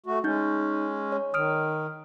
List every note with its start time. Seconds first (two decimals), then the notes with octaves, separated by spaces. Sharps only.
0.06 A3 F#4
0.24 G#3 C#4 D#4 G6
1.12 C#5
1.34 D#3 D#6 F6 D7